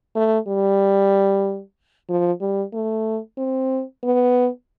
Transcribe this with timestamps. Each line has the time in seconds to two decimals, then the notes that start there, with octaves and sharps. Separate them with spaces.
0.16 A3
0.48 G3
2.09 F3
2.41 G3
2.74 A3
3.38 C4
4.03 B3